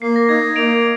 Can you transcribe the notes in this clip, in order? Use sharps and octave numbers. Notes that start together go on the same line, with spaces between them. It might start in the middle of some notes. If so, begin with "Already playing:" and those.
A#3 C7
A#6
D#4 G#6
A#3 D7 F7